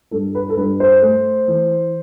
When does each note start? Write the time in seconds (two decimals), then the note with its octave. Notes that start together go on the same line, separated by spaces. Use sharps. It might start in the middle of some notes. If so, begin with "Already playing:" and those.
0.11 G2 A4
0.35 B4
0.49 A4
0.57 G2 B4
0.80 C5
1.02 A3
1.48 E3